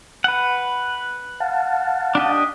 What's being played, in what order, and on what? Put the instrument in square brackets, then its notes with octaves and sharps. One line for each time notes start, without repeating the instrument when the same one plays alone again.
[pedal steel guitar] B4 F#5
[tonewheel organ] F5 F#5 A5
[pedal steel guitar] D4 G4 D#5